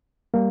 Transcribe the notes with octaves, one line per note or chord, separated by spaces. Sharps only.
G3 A#3